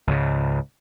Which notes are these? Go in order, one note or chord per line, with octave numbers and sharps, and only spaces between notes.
C#2 G#2 C#3